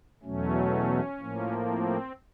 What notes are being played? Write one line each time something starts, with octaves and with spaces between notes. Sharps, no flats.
E2 B2 F#3 A3 C#4
A2 F3 A#3
C4